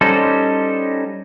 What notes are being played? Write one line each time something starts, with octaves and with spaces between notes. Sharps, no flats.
G3 C#4 D#4 A4 C5